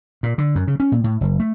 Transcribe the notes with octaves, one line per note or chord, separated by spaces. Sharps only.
A#2
D3
F#2
C#3
C#4
A#2
A2
F#1
A3